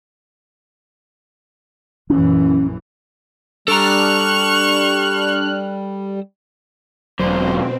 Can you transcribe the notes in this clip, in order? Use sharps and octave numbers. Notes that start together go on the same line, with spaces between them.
A#1 F#2 E3 C#4
G3 D4 A4 A#5 C#6 F6 F#6 F7
E1 C#2 B2 D3 F#3 C4 C5